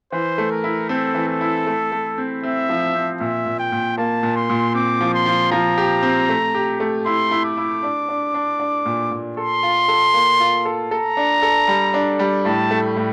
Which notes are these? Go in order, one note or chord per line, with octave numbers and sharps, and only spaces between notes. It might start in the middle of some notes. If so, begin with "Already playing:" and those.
E3 C5
A3
A#4
E4
C4 A4
E3
A4
E4
A3
A3
C4
C4 E5
F3
C4
A#2 E5
A#2
G5
A#2
A#3 A5
A#2
C6
A#2
C4 D6
F3
C6
F3
F3 A#5
G4
C4
A3
G4
A3
E4 C6
E4
D6
E4
D4
D4
D4
D4
A#2
A#2
A4 C6
F4
A4
A#3
F4
A4
A4 A#5
D4
A4
G3
D4
G3
A2 A5
A3
A2